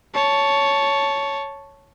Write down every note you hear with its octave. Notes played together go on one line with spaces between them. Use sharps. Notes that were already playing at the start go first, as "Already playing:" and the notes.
C#5 A5